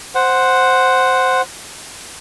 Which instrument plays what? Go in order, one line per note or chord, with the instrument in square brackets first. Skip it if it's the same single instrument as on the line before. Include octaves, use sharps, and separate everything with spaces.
[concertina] C5 F#5